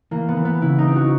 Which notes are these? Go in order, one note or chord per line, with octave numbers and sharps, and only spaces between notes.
E3 A#3
B3
E3
B3
C#3 E4
D#4
C4
F#4